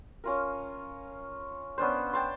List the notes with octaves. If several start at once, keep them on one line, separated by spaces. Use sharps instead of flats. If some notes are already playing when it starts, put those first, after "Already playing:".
C#4 F4 A#4
B3 C#4 D4 C5
G5 A5 C6